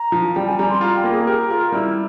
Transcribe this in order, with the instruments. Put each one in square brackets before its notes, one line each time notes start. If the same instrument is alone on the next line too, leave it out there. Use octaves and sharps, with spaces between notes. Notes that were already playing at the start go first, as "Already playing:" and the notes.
Already playing: [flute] A#5
[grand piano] F3
[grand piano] G3 [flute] G5
[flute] G#5
[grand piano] G3 [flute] A#5
[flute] C6
[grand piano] F4 [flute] A#5
[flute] G5
[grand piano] A#3
[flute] G#4
[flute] G4 [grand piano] A#4
[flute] F4 [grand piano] A#4
[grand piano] G3 [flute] E4